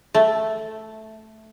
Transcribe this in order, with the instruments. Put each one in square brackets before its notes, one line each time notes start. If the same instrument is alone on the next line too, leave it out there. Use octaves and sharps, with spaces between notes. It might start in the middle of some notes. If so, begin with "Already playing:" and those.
[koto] A3